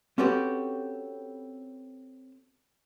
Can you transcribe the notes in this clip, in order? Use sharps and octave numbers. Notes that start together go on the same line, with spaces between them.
C4 C#4 F#4 G4 A4 B4